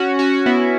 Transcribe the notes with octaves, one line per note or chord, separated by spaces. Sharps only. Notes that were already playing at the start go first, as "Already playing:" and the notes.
Already playing: C#4 F#4
C#4 F#4
F#4
B3 E4